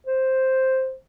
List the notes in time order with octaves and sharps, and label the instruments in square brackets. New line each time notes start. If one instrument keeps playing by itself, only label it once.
[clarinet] C5